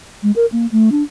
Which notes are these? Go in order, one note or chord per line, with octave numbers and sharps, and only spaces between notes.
G#3
A#4
A#3
A3
D4